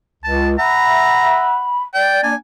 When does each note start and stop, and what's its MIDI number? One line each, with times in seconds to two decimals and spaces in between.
0.24 0.57 37
0.24 0.49 81
0.58 1.74 76
0.58 1.74 78
0.58 1.48 82
0.58 1.82 83
1.94 2.29 74
1.94 2.22 79
2.23 2.35 58
2.23 2.35 62
2.23 2.35 80